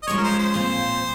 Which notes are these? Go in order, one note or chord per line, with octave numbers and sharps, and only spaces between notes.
D#5
F3 G#3 C#4 C#5
A#4
C5
C5
A#2 F3 C4